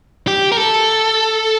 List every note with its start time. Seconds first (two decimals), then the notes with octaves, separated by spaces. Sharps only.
0.28 G4
0.52 A#4
0.57 A4